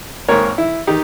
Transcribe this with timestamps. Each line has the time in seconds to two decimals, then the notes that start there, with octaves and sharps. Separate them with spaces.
0.28 G#1 G#2 D#3 A#3 A#4 C#5
0.58 E4
0.87 D#3 D#4 G4